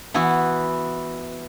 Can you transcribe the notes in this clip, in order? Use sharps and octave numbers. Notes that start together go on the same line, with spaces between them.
E3 B3 E4 F#4